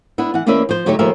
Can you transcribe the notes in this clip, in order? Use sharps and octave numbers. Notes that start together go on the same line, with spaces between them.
B3 D4 E4
E3 F#5
E2 A#3 C#4 B4 D5 E5
F3 C5
D3 F#3 A3 D#4 G4 C#5
D#2 F3 G3 G#4 A#4 E5